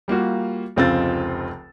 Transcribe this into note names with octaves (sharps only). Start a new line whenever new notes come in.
G3 A#3 F4 F#4
F1 C#2 C4 F4 E6 A6